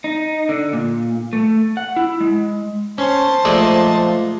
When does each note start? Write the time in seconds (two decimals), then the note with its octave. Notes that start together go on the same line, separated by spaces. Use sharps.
0.04 D#4
0.49 D3
0.73 A#2
1.33 A3
1.77 F#5
1.96 E4
2.21 G#3
2.98 C#4 C5 A5
3.45 A#2 F3 G#3 A3 A4 D5 D#5